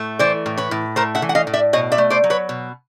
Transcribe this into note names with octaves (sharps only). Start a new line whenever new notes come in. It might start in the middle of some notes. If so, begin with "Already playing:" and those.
Already playing: A2 A3
E3 C5 D5
A2
B4 C#5
A2
A3 A#4 C5
E5 F#5
E3
F#5
D#5 F5
A2
D5 E5
B2 C#5 D#5
D5 E5
A3
C5 D5
F#3
B4 C#5
B2